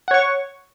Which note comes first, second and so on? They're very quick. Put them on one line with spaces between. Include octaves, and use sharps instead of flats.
F#5 C#5 C#6